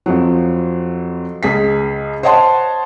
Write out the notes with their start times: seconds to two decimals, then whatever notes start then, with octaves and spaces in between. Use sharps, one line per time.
0.06 F2 F3 F#3
1.43 C#2 G#4 B6
2.23 C5 C#5 D#5 F#5 A5 C6